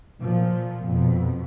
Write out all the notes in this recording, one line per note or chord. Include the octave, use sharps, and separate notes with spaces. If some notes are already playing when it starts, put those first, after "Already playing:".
A#2 F3
F2 B2